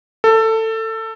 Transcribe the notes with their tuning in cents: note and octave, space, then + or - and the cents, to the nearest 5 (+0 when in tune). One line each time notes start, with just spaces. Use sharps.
A4 +20